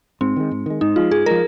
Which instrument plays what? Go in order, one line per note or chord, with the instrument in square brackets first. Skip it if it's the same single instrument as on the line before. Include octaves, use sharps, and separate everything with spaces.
[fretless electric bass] G#2 [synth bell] C4
[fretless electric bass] D#3 G#3
G#2
D#3 G#3
[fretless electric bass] G#2 [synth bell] D#4
[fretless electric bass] F3 G#3 [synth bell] F4
[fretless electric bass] G#2 [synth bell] G#4
[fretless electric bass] F3 G#3 [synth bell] A#4